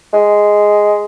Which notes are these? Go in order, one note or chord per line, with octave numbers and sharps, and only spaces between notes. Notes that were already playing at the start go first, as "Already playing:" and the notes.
G#3